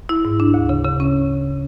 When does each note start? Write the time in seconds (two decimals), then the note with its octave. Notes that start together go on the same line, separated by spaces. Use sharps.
0.09 E4
0.25 G#2
0.40 D4
0.54 D2
0.69 C#3
0.84 C#3
1.00 C#4